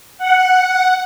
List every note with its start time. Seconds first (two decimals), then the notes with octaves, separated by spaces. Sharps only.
0.18 F#5